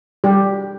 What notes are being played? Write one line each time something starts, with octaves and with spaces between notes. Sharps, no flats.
G3 G4